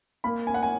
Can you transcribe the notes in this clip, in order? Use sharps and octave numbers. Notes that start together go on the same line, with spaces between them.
A#3 B5
G#5
F#5
G#5